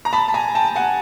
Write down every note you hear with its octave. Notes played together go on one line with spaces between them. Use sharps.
A#5
A5 B5
A5
G#5 A#5
G5 A5
F#5 G#5